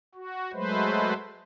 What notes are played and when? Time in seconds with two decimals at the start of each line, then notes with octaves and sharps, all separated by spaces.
0.15 F#4
0.53 F#3 G#3 A3 B4 C5